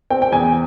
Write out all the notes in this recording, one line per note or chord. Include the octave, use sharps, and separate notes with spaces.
C4 G5
G5
E2 G#5